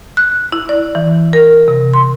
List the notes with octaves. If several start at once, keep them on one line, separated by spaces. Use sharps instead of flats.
F#6
E4
D5
E3
A#4
C3
C6